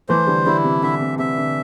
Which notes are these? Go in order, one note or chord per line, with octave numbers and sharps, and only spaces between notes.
E3 A3 C5
D3 G3
D3 G3 E4
C3
D3 E5
C3
C3 E5
D3